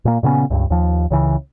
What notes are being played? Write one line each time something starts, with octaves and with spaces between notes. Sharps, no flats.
A#2 A#3
A#2 C#3 B3 C#4
C#2 G2
D#2 F3
C#2 C#3 E3